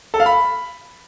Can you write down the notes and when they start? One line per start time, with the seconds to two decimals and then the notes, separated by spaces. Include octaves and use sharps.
0.14 A4
0.20 F5
0.26 B5